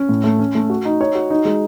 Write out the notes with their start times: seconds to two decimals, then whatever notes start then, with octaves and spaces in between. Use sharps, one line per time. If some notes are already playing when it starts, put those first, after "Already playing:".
Already playing: C#4
0.09 A2
0.24 A3
0.39 C#4
0.55 A3
0.70 F#4
0.85 D#4
1.01 C#5
1.15 F#4
1.30 D#4
1.45 G#3